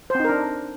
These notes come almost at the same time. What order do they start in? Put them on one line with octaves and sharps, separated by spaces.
C5 C4 D#4 A#4 D4